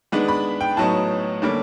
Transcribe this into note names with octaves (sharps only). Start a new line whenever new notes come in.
D#3 G#3 B3 D4
B5
G5
A2 F#3 B3 D#4 A5
D3 G3 A#3 C#4